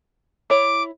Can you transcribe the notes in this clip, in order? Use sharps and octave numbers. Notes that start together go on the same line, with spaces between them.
E4 C#5 D6